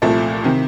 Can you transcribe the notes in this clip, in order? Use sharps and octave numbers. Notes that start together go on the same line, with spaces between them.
C2 A#2 F3 A3
C3 D#3